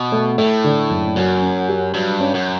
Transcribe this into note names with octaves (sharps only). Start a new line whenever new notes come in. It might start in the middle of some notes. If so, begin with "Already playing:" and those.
Already playing: B2
A3
A2 A3
D3
F#1
F#2 F#3
C#4
G4
G2 F#3
C#4
F#2